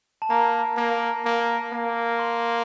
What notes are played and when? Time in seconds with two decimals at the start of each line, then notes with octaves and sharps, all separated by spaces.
0.22 A5
0.29 A#3 A#5
0.77 A#3
1.25 A#3
1.72 A#3
2.19 C6